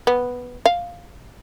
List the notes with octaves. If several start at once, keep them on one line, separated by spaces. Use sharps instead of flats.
B3
F5